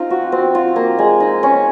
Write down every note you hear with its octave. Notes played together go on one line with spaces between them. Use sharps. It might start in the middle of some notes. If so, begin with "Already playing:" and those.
Already playing: C4 D#4 F4
F#4
C4
F4
A#3
G#3
D#4
C#4